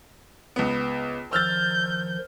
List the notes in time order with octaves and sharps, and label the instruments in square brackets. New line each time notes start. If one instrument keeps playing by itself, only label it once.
[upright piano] C#2 B3
[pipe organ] D#3 F3 [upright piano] E6 F6 A6 [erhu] G6